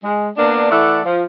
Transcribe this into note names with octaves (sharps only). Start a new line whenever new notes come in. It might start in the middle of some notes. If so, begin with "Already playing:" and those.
G#3
A#3 B3 D4
E3 A3 A4 D5 F#5
F3